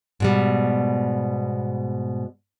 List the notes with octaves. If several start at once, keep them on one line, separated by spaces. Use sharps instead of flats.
G#2 B2 G3